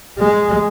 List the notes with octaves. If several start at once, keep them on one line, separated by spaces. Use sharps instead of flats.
G#3